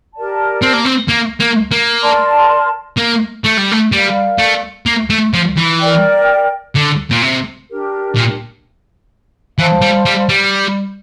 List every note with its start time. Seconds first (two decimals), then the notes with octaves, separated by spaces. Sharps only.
0.14 G4 A#4 D5 A5
0.62 C4
0.73 A#3
0.85 C4
1.08 A#3
1.40 A#3
1.71 A#3
2.02 A#4 D5 A5 C6
2.98 A#3
3.45 A3
3.58 G3
3.72 A3
3.92 G3 A#4 D5 F5
4.38 A3
4.86 A#3
5.10 A3
5.33 F3
5.57 E3
5.81 A#4 D5 G5
6.75 D3
7.11 A#2
7.22 C3
7.69 D4 G4 A#4
8.16 A#2
9.58 E3 C5 F5 A5 C6
9.82 G3
10.06 G3
10.29 G3